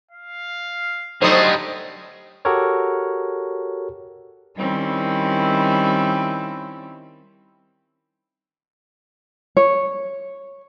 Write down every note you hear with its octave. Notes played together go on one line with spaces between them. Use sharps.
F5
D3 F#3 G3 A3 D#4 C5 C6 D#6
F#4 G4 A4 A#4 C#5
D#3 G3 C4 C#4 E4
C#5